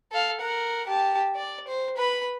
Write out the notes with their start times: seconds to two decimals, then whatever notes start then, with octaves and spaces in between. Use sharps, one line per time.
0.12 A4 F5
0.41 A#4 F#5
0.87 G4 A5
1.35 D5
1.67 C5
1.97 B4 B5